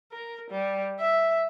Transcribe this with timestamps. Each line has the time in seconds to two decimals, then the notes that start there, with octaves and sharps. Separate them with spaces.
0.12 A#4
0.50 G3
1.00 E5